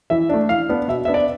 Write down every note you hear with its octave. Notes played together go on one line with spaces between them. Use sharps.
E3 E5
A3 D4
E3 F5
B3 D4
B2 E5
B3 D4 E5
D5